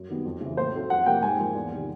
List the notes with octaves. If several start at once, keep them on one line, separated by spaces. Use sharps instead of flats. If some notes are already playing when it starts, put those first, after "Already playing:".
Already playing: F#2
D#3 G3 B3
F2
C#3 E3
A2 C5
F#3 A3 C4
F2 F#5
C3 F3 A#3 G5
G#2 G#5
F3 A#3
E2
C3 D#3 G3